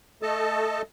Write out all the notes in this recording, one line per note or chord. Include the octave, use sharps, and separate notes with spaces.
A3 A4 D#5 A5